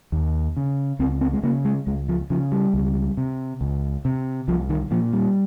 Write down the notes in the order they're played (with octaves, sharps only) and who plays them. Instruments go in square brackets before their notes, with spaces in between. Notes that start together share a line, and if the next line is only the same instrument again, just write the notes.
[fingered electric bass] D#2
C#3
C#2 C4
C4
G#3
C#3 A#3
G#3
C#2 G#3
F3
C#3 F3
G3
C#2
C3
C#2
C3
C2 F3
D#3
A#2 F3
G3